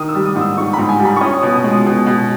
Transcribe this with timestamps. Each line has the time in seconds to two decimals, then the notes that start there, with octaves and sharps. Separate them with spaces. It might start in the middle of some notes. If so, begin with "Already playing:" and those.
Already playing: D#3 D#6
0.09 E6
0.15 G3
0.25 D#6
0.36 G#2
0.41 E6
0.57 G#2 C#6
0.73 G#2 B5
0.89 G#5
1.00 G3
1.05 B5
1.16 C#6
1.21 C#4 D#6
1.31 C#6
1.38 B2 D#6
1.54 D#6
1.64 G#3
1.70 D#6
1.86 B2
2.06 B2